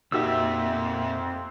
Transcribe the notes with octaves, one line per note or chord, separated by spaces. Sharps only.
F2 A#2 C4 D#4 F#4 G4 E5 E6